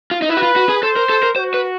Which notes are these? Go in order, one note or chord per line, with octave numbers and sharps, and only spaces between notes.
F4
D#4
E4 B4
F#4
F4
F#4
G#4
A4 C5
A#4
A4
A#4
F#4 C5
B4